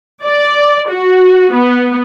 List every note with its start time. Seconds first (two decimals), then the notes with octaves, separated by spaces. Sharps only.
0.23 D5
0.89 F#4
1.53 B3